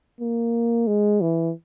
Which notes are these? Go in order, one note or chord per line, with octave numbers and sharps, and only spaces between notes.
A#3
G#3
E3